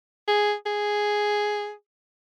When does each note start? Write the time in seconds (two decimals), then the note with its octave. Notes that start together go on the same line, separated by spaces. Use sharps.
0.28 G#4
0.66 G#4